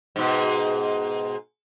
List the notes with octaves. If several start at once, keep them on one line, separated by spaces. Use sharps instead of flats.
G#2 B2